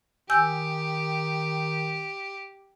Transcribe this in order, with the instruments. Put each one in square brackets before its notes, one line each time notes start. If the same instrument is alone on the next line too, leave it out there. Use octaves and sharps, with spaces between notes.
[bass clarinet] D#3 [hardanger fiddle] G4 [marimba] G#5 E6 G6